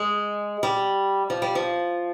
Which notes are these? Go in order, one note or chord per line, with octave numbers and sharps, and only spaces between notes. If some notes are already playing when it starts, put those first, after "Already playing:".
Already playing: G#3
G3
F3
G3
F3